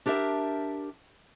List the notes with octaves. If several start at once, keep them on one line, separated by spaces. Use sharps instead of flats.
D4 G4 A#4 D#5 E5 A5